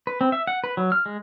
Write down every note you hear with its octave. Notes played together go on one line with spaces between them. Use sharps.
B4
C4
E5
F#5
B4
F#3
F6
G#3